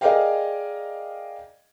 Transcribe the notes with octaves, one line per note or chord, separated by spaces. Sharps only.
G#4 A#4 D5 D#5 F5 G5